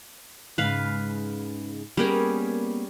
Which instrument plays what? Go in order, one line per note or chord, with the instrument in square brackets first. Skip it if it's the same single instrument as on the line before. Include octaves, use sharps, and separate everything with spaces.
[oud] G#2 C#3 [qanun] B4 F5
[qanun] G3 C#4 G#4 [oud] A#3 B3 A#4